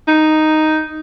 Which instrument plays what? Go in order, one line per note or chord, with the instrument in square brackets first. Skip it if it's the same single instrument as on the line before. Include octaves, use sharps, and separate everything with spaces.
[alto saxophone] D#4